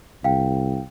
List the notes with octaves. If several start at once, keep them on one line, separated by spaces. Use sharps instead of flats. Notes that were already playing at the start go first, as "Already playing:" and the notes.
C2 F5 G5